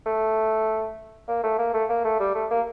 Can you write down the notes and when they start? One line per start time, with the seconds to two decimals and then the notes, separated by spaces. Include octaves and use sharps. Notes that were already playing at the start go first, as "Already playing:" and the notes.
0.06 A3
1.28 A#3
1.43 A3
1.58 A#3
1.73 A3
1.89 A#3
2.04 A3
2.20 G3
2.35 A3
2.51 A#3